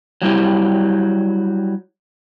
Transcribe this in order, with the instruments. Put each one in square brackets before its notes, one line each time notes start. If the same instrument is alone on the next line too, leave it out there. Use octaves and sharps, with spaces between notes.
[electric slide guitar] F#3 G3 E4 G4